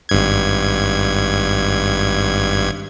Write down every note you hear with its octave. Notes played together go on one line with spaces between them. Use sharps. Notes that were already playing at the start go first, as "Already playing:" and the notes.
G#1 G2 G#6